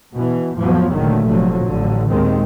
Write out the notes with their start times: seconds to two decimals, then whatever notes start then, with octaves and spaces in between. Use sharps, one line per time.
0.15 B2 E3
0.57 F2 A2 F3 F#3 B3
0.93 F#1 A#2 D3 D#3 F#3 A3
1.27 F1 D3 F3 F#3
1.65 A1 D3
2.08 D#2 A#2 D#3 G#3 C4